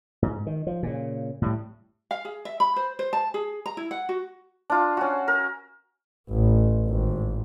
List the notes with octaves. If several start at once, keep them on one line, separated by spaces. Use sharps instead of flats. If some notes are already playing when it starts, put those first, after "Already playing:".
G#2
D#3
F3
A#2 C#3
A2 G3
F5
G#4
E5
B5
C5
C5
A5
G#4
A#5
E4
F#5
F#4
D4 F4
C#4 F#4
A#4
A1
G#1